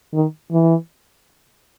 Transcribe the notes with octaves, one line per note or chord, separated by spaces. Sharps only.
D#3
E3